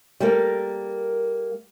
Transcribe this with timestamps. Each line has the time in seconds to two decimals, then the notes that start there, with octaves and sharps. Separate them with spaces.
0.20 G3 A#3 A4 A#4